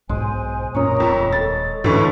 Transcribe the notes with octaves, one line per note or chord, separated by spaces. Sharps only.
B1 G#2 G#3 C5 G#5
F#2 A#2 C#4 A#4 C#5 A#5 D#6
D#1 F2
A4 A6
D2 G#2 D3 E3 C#4 A4 C#5 C#6